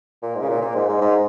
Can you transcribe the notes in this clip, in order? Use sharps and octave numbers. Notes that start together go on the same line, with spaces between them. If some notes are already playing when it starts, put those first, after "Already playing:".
A#2
G#2
C#3
A#2
A#2
G#2
G#2
G#2